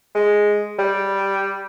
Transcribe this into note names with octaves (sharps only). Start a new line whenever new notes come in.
G#3
G3